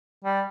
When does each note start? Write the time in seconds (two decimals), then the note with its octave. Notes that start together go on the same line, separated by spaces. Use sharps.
0.25 G3